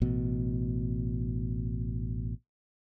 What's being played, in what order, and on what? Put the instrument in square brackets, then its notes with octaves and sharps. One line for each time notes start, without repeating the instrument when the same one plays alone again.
[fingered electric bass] A1 B2